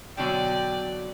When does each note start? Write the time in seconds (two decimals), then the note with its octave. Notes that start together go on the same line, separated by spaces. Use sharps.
0.17 B2 D3 F#3 D5 G5